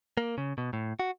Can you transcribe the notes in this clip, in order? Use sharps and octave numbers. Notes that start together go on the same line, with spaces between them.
A#3
C#3
B2
A2
F#4